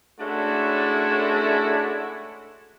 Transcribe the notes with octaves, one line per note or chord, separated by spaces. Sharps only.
G#3 A3 C#4 D4 E4 F#4